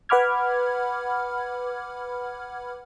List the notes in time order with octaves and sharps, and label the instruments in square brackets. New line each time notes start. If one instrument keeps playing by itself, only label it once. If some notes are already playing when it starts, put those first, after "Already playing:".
[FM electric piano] B4 F#5 B5 D6 F6 G#6